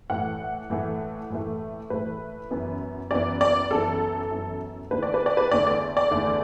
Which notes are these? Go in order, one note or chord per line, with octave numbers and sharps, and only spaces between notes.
A2 E3 A3 F#5
A2 E3 A3
A2 E3 A3
A2 E3 A3 B4
F#2 E3 B3
F#2 E3 B3 D5
D5
F#2 E3 B3 A4
F#2 E3 B3
E2 D3 A3 B4
D5
B4
D5
B4
E2 D3 A3 D5
D5
D5
E2 D3 A3